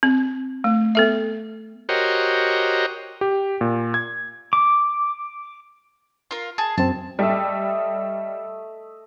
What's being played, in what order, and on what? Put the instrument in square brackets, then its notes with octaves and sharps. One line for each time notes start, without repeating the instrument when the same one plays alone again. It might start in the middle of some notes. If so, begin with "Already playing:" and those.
[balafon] C4
A3
B3 A4 E5
[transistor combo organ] F#4 G4 A#4 C5 C#5 D#5
[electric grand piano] G4
A#2
G#6
[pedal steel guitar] D6
[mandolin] F4 A#4
G#4 A5
[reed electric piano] F#2 C4 [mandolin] A5
[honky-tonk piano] G3 [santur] A3 D#5 E5